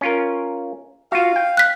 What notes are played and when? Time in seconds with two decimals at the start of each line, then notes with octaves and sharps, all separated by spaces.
0.01 C#4 F4 A#4
1.12 F4 F#4 F5
1.36 G5
1.57 F#6 B6